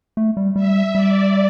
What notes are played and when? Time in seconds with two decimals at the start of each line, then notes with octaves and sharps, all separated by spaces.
0.17 A3
0.37 G3
0.56 G3 E5
0.95 G3 D5